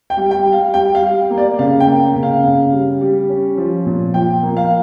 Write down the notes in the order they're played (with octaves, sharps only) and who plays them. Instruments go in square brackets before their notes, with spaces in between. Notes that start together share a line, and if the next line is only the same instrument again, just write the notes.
[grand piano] G5
G3
G5
G3
F5
G3 G5
F5
G3
A#3
D5
C#3 F5
G5
A#3
C#3
F5
C#3
G3
G3
C#4
F3
A#2
F3 G5
A#3
F5